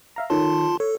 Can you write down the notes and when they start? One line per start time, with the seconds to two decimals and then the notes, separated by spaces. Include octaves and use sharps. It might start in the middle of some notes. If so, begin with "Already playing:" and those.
0.16 E5 F5 A#5
0.30 D#3 F4 A4 C#5 A5 C6
0.80 A4 C#5